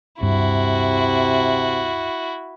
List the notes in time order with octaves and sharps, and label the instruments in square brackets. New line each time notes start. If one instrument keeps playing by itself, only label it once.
[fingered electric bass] D1 G2 [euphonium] C3 [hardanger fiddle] E4 F#4